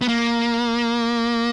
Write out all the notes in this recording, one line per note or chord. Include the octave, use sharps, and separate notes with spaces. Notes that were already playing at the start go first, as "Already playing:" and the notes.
B3
A#3